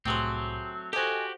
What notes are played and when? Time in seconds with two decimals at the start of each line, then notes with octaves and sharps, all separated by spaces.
0.05 C2 A2 F#3 A3 C4 G4 G#4 C5
0.93 F#4 G4 A4 C5 D#5 G#5